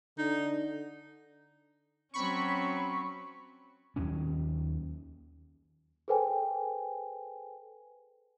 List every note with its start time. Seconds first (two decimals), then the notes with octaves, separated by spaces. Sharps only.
0.18 D3 D#4
2.14 F#3 C4 C#4 B5 C#6
3.96 D#2 D#3 F#3 C#4
6.08 G#4 A4 B4 C5 G5 G#5